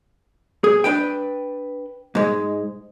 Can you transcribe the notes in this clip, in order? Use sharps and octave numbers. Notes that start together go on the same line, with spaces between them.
G#4
D4 B4 G5
G#2 G#3